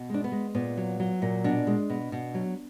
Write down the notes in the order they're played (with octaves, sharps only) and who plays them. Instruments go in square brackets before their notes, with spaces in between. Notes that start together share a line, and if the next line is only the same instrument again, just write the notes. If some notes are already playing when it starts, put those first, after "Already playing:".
Already playing: [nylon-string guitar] B2
G#3 D4
B3
G#3
A#2 B3
F#3
F#3
A#2
B2 D4
G#3
B2
B2
F#3